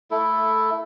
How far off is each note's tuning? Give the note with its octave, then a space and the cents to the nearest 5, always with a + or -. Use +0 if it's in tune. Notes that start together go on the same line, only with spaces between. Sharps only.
A3 +5 E4 +0 A4 +0